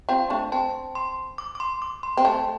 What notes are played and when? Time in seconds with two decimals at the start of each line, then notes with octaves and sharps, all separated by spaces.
0.09 C4 F4 G5
0.30 A3 D4
0.52 C4 A5
0.95 C6
1.38 D6
1.55 D6
1.60 C6
1.82 D6
2.03 C6
2.17 C4
2.25 A3 A5